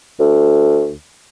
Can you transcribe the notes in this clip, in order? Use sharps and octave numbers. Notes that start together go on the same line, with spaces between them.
D2